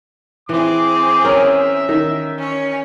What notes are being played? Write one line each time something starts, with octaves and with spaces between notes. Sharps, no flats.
E3 C4 G#4 D6
C#4 A#4 E5 G5
D#3 A#4
C#4 C#5